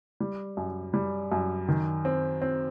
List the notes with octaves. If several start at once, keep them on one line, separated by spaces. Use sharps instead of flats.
G3
F#2
G3
F#2
D#3
C4
C4